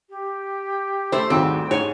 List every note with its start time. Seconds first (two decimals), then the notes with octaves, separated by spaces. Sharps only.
0.09 G4
1.12 A3 E4 C5
1.30 D#2 G#2 G3 C4 F#4
1.71 G#2 C#5 G#5